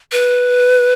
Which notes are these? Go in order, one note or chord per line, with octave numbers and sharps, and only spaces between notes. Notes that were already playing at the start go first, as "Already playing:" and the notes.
B4